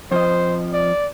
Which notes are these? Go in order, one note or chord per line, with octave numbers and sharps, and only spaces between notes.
F2 F3 C5 D#5
D5